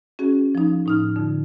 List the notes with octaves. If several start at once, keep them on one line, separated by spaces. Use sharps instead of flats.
C#4 F#4 G#4
F3 D#4
A2 D#4 F6
F2 D3